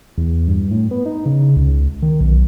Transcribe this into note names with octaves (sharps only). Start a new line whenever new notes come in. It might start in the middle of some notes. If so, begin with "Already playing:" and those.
E2
G2
A2
B3
D#4
C#3
C#2
D#3
B1